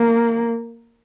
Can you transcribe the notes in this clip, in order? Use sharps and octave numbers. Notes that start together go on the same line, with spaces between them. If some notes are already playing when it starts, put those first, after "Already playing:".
Already playing: A#3